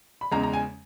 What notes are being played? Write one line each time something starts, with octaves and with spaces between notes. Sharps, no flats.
B5
E2 C#3 G#3 A#5
A#5
G#5